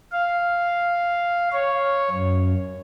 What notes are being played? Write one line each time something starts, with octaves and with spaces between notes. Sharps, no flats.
F5
C#5
F#2